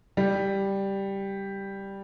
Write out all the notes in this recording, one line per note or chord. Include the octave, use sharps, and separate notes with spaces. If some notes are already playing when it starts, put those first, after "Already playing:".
G3